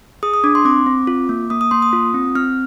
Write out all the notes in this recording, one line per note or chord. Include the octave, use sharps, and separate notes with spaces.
G#4 D#6
D#6
D4 D6
C6
C4 D6
C4
F4
A#3
A#3 D#6
D#6
A#3 C6
D#6
F4
C4
C4 F6